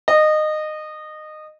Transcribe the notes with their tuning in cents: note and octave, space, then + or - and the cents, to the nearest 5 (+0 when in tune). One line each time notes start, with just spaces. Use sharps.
D#5 -20